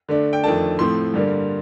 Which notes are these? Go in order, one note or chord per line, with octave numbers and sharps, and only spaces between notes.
D3 A3 D4
G5
F2 D#3 A3 D4 A5
A2 F3 A3 C4 C6
G2 D3 G3 A#3